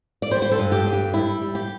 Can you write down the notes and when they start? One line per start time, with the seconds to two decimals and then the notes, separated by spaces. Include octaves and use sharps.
0.22 D5
0.31 G3 C5
0.42 C5
0.51 A4
0.59 G2
0.72 G4
0.86 G2
0.93 G4
1.13 G3 E4
1.42 G3
1.55 G4